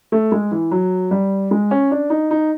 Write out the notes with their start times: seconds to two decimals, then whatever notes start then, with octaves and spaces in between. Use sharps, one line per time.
0.12 A3
0.32 G#3
0.51 E3
0.71 F#3
1.11 G3
1.51 G#3
1.71 C#4
1.91 D4
2.10 D#4
2.31 D#4